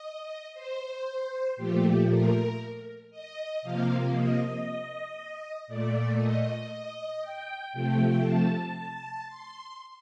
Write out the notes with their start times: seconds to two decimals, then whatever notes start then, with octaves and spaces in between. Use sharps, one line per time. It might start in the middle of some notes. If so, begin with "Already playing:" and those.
Already playing: D#5
0.54 C5
1.57 A#2 F3 A3 G4
2.08 A#4
3.11 D#5
3.62 C3 F3 A#3 F5
4.13 D#5
5.68 A#2 A3 D5
6.19 D#5
6.70 D#5
7.22 G5
7.73 C3 F3 A3 G5
8.24 A5
8.76 A5
9.27 C6